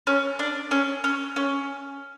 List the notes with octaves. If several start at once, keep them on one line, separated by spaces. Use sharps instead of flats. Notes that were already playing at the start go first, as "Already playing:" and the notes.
C#4
D4
C#4
C#4
C#4